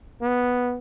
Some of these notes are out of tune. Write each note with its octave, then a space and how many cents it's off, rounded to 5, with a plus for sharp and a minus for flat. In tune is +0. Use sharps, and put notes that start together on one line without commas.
B3 -5